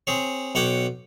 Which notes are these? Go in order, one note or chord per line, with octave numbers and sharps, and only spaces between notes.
C4 G#4 C#5
B1 C#5 F#5 G5 D6